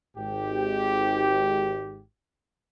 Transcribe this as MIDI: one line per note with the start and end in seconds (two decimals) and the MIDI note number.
0.17 2.02 32
0.17 2.02 44
0.17 2.02 67